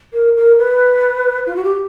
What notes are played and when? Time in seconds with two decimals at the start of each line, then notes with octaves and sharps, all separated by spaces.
0.13 A#4
0.36 A#4
0.59 B4
1.46 F4
1.56 F#4
1.64 G4